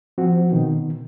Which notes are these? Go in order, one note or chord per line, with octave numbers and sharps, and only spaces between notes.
F3 C4 F#4
B2 D#3